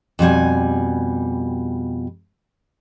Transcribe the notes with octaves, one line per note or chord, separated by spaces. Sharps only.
F2 B2 G3 G#5